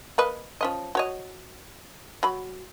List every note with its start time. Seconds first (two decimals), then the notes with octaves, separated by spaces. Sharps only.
0.18 A#3 B4 D#5
0.61 F3 C#4 D#5
0.95 F#4 C#5 D#5
2.23 F#3 B5